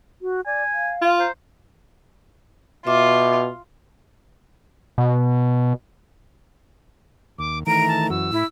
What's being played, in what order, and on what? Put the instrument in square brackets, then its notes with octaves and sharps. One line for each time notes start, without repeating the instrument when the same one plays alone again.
[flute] F#4
[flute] D5 [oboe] G#5
[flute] F5
[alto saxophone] F4
[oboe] C5 [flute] A#5
[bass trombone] B2 [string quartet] F4 [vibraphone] E5 D6
[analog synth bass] B2
[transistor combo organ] D#2 [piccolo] D6
[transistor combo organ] D#3 E3 A3 [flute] A#5 [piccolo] D7
[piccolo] A5
[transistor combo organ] F#2 E3 F#4 [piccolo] E6
[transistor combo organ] A2 [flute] E4